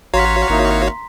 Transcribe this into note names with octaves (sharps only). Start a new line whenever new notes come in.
A1 F#4 C#5 F5 A#5 C6 B6
G#1 A#3 D#4 E4